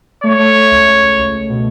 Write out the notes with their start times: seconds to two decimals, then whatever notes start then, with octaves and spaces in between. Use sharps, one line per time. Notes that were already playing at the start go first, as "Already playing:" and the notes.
0.24 A3 C#5
0.39 A3
0.55 A3
0.71 C#2
0.87 A3
1.02 C#2
1.18 C#2
1.34 C#2
1.49 B2